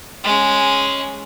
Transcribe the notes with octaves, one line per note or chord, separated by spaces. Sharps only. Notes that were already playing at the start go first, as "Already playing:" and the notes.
G#3 C#4